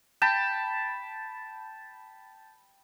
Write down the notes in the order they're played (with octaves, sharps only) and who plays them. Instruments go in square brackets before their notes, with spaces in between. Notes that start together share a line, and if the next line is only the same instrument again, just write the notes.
[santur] G5 A5 B5